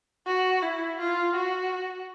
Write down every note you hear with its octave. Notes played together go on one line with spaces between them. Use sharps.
F#4
E4
F4
F#4